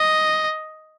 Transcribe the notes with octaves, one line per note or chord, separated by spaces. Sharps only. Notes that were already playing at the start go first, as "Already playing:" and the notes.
Already playing: D#5